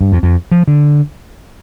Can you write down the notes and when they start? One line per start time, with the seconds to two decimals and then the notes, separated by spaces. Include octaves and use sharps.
0.01 G2
0.12 F2
0.23 F2
0.51 F3
0.68 D3